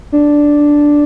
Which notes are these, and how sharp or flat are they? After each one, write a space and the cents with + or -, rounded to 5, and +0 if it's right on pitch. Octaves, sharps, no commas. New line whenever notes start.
D4 +0